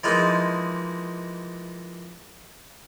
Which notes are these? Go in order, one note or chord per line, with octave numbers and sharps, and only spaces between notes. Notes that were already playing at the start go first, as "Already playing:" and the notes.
E3 F3 G#3 A#3 D#4 F4